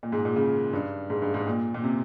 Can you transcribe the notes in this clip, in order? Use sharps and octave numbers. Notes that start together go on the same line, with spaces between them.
A#2
G#2
A#2
C#3
G2
G#2
G2
G#2
A#2
A#2
C3